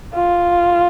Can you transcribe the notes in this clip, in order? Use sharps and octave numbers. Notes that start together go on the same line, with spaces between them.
F4